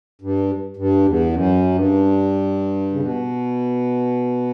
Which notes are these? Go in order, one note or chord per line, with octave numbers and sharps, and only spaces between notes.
G2
G2
E2
F#2
G2
C#3
B2